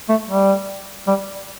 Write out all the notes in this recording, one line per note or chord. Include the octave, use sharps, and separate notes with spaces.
A3
G3
G3